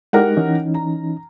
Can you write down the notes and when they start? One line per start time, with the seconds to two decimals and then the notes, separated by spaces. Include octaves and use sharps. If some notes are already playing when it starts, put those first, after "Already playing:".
0.13 G#3 D#4 G4 A#4 F#5
0.37 E3 C#4 D#4
0.74 A#5